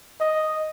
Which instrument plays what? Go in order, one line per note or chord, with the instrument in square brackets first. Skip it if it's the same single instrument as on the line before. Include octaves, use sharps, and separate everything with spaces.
[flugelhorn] D#5